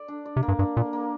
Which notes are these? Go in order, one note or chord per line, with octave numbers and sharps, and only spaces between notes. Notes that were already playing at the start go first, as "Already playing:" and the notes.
Already playing: D5
D4
D5
C3
A#3
G2
G2 D4
A#2 A#3
A#3